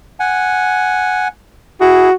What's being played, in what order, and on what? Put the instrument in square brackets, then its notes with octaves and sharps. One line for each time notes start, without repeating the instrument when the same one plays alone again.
[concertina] F#5 G#5
[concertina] E4 G#4 [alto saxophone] F#4